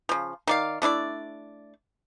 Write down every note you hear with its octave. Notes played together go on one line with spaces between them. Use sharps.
C#3 F3
D#3 D5 F5
A3 D4 E4 D5